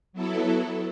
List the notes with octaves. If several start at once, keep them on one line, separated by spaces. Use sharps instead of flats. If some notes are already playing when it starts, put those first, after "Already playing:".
F#3 B3 E4 A4